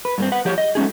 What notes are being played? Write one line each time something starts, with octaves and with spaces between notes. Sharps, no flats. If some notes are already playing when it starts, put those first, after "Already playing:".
B4
G2 A#3 C4
B4 F#5
F3 G4 C#5
D#5
F#3 G#3 A3 C#4 D#4 G#4